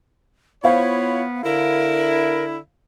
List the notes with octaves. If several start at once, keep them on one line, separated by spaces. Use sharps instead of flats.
B3 E4 F4 C5 C#5 F5
D3 E4 A#4